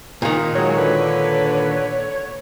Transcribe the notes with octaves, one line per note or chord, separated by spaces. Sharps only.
A#2 D#3
F#3 G#3 C#5
D3 B4